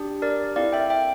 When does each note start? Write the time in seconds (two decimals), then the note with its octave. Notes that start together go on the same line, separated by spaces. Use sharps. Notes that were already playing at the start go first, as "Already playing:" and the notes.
Already playing: D4 G4
0.22 A#4 D5
0.56 C4 E4 A4 D5 F5
0.72 E5 G5
0.90 E5 G5